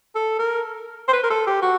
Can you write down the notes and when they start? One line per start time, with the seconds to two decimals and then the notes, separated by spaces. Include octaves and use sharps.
0.15 A4
0.39 A#4
1.08 C5
1.13 B4
1.24 A#4
1.30 A4
1.47 G4
1.62 F#4